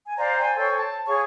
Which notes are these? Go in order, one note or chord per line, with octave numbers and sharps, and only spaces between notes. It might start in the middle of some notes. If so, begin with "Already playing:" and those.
G#5
C5 D5 F5 A#5
C5 G5 G#5
A4 C5 C#5 G5
A5
G#4 C#5 F5 C#6